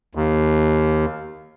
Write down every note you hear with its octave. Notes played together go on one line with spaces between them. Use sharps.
D#2